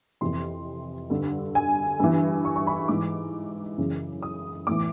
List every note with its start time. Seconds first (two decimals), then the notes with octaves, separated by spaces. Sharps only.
0.21 F2 C3 E3 C6
1.10 G2 D3
1.55 G#5
2.00 G2 E3
2.45 C#6
2.56 C#6
2.67 B5
2.88 G#2 E3 D6
3.78 F#2 C#3 E3
4.23 D#6
4.67 A2 E3 D6